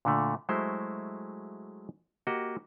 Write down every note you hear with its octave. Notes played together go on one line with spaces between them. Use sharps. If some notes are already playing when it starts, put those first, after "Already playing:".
A#2 D3 A3
F#3 G#3 A3 E4 C5
A#3 F#4 G4 D#5